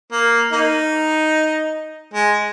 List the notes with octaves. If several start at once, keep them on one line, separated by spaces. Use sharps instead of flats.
A#3
A#3 D#4
G#3